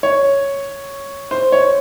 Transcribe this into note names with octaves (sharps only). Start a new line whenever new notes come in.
C#5
C5
C#5